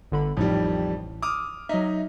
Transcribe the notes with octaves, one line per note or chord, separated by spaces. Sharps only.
G1 D3 B5
A1 F2 A2 D#3 G3
D6 D#6 F6
F#3 D#4 D#5 E5